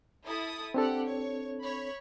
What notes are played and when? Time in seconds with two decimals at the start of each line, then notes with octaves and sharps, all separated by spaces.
0.24 E4 A4 D#6
0.74 C4 D4 G4 A4 F#5
1.06 C#5
1.63 C#5 B5